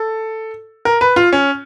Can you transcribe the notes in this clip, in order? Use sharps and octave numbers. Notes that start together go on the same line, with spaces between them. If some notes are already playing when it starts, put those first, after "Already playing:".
Already playing: A4
A#4
B4
F4
C#4